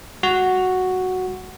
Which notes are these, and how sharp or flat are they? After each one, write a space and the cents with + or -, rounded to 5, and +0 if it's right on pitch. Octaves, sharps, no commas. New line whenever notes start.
G#3 -30 F#4 +0